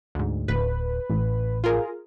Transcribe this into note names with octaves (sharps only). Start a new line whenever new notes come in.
D2 G#2
D1 B4
A1
F4 G#4 A#4